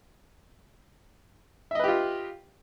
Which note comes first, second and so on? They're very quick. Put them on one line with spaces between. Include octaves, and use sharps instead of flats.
E5 D#5 B4 G4 F4